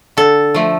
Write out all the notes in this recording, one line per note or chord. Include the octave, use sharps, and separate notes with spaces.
D3 A4
F3 A3